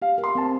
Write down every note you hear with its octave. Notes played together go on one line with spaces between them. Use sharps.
G4 F5
A#4
C6
C4 A5